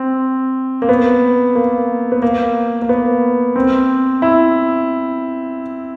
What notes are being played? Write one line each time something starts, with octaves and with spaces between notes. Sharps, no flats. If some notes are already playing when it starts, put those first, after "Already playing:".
Already playing: C4
A#3
B3
A#3
B3
A#3
A#3
B3
C4
E4